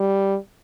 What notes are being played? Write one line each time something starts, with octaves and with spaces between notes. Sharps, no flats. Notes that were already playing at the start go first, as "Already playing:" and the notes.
Already playing: G3